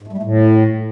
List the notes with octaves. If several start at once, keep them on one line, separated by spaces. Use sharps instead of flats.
G#2
A3
G3
A3
A2